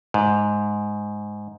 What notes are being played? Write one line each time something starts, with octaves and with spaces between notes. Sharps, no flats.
G#2